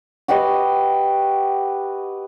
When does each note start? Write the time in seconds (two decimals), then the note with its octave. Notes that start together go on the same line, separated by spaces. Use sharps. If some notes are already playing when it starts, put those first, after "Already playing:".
0.28 F#4 G4 B4 D#5